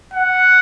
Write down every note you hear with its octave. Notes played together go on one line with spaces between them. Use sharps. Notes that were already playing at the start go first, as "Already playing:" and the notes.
F#5